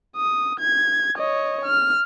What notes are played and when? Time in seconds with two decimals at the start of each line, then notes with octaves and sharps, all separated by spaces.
0.16 D#6
0.60 G#6
1.18 C#5 D#5
1.65 F6